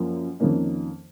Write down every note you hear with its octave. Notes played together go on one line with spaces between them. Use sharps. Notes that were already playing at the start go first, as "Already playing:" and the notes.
Already playing: F#2 F3 A#3
F2 D#3 A#3 C#4